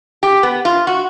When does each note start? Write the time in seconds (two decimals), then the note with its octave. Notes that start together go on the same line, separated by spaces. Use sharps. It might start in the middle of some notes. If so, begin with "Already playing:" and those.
0.23 G4
0.43 B3
0.65 F4
0.87 F#4